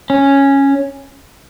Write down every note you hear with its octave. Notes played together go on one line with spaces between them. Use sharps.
C#4